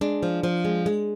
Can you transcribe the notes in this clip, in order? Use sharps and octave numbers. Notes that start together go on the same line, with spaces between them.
G#3 D4
F3
F3
G#3
G#3